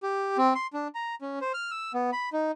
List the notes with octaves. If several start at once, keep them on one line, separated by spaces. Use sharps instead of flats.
G4
C4
C6
D4
A#5
C#4
C5
F6
E6
B3
B5
D#4